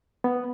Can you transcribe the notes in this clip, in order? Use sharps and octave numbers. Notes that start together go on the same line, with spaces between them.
B3